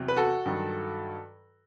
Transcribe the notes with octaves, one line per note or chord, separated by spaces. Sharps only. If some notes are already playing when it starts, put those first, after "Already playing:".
Already playing: E2 C3 F#3
B4
F#4 A4
G2 D#3 F#3